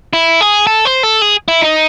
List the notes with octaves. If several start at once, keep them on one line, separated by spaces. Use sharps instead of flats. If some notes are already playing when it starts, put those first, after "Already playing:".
E4
G#4
A4
C5
A4
G#4
E4
D#4